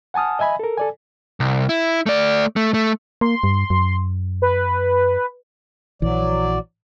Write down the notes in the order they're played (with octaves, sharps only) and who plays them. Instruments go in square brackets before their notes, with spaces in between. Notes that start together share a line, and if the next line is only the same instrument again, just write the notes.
[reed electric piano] F#5 G#5 A5 D#6 F6
D#5 E5 G#5 B5
A4 A#4
A4 D5 G#5
[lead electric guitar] C2
E4
A3 D5
A3
A3
[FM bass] A#3 [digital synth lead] C6
[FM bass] G2
F#2
[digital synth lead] B4
[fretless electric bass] A#1 E3 [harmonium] F#3 D5